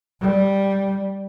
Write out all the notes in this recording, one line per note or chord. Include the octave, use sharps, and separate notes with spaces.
G3